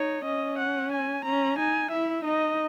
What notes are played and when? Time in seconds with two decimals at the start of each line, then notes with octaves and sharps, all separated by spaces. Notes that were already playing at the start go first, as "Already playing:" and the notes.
Already playing: D#4 C#5
0.25 C#4 D#5
0.59 F#5
0.92 G#5
1.25 C#4 A#5
1.59 D#4 G#5
1.91 E4 E5
2.25 D#4 D#5